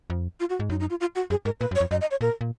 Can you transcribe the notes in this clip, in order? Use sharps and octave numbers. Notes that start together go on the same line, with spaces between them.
F2
F4
F#4
G#2
F#2 D#4
D#4
F4
F4
F#4
F#2 G#4
G#2 A#4
A#2 B4
F#2
C#5
F2
F#2 D#5
D#5
C#5
A#2 A#4
A#2